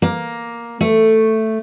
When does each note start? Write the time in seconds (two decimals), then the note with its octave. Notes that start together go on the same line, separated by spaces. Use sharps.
0.02 A#3
0.81 A3